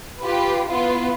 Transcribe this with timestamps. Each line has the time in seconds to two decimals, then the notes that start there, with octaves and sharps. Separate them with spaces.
0.21 F4 G4 B4
0.69 B3 E4 F4